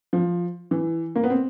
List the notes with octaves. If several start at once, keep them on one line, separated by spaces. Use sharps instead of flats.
F3
E3
A#3
B3
C4